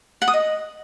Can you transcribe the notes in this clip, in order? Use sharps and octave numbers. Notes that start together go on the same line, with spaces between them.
F#5
D#6
D#5